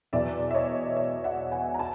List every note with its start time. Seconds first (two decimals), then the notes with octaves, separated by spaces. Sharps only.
0.13 E2 B2 F#3 D5 E5
0.51 E5
0.54 C#5 D#5
0.96 D5 E5
1.24 E5 F#5
1.52 F#5 G#5
1.74 A#5
1.79 A5